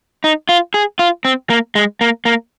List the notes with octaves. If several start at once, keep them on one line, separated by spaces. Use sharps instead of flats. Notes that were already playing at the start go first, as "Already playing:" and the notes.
D#4
F4
G#4
F4
C4
A#3
G#3
A#3
A#3